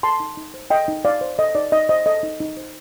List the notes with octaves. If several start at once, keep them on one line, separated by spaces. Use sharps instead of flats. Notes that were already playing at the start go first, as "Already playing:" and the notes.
A4 A5 C6
D#4
D#4
C5
A4 D#5 G5
D#4
D#4 D5 F5
C5
A4 D#5
D#4 D5
D#4 D#5
C5 D#5
A4 D#5
D#4
D#4
C5